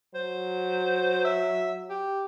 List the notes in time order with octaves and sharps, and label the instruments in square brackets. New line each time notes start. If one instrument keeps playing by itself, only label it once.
[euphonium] F#3 [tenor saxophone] C5
[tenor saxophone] E5
G4